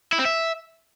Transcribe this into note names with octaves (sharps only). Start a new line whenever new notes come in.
E4
C4
E5